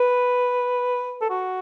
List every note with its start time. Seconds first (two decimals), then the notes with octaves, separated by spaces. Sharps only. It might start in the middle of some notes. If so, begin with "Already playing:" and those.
Already playing: B4
1.21 A4
1.30 F#4